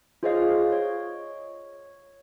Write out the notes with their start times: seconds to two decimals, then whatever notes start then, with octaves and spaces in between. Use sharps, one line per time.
0.23 F4 G#4 C5 C#5 D#5 F5
0.72 C#5